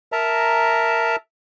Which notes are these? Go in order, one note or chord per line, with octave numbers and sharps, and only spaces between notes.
A#4 E5 A5 A#5